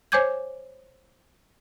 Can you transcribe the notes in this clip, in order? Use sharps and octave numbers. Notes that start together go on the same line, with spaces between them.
C5 C#5 G#5 D6 G6 G#6